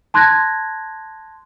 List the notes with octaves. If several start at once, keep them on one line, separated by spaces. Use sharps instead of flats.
A5 C6 F#6 G#6 A#6